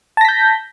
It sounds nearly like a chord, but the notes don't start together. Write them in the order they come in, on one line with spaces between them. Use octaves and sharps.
A5 A#6 B6 G6